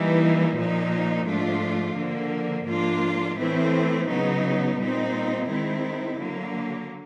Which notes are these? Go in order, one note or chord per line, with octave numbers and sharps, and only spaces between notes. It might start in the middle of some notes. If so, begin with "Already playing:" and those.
Already playing: E3 G3 A#3 D#4
A#2 F3 A#3 D#4
G#2 F3 A3 D4 F4
D3 F3 A#3
G#2 F3 A#3 D4 F4
A2 E3 A3 C4 E4
C#3 F#3 B3 D#4
A#2 G3 C4 D#4
D#3 G#3 C4 E4
D3 F#3 A#3